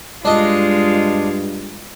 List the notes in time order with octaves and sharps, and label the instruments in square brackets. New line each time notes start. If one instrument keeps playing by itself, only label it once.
[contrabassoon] G2 [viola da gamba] G#3 F4 [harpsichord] D4 D#5